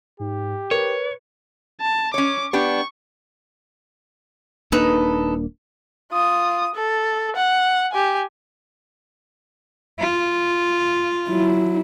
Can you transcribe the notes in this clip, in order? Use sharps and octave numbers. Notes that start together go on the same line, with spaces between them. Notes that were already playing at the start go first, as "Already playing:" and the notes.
G#2 G4
A#4 B4 C#5
A5
C#4 C#5 D6
B3 D4 G4 C#6
D#1 A#3 D4 D#4 A4 B4
F4 D#6
A4
F#5
G4 G#5
F4
F#3 E4